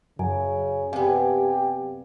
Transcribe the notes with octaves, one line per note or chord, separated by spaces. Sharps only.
F#2 C#3 G#5
C3 B3 G4 D5 F5 G#5